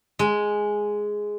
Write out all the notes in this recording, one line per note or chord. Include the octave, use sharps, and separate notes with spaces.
G#3